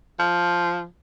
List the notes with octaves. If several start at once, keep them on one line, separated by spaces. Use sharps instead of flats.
F3